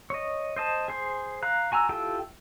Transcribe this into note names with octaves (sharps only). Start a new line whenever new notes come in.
C#5 D#5
C5 D#5 A5
G#4 C5
F5 A#5 F#6
F#4 G#5 A#5 E6
E4 F4 G4 A4 G5